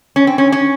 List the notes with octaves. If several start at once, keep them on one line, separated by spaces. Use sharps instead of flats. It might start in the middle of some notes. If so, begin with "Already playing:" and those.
C#4
C4
C#4
C#4